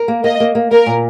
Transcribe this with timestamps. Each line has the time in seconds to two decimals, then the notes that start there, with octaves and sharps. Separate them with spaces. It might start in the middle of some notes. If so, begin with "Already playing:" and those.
Already playing: A#4
0.08 A#3
0.23 A#3 D#5
0.40 A#3
0.55 A#3
0.71 A#3 A#4
0.86 A#2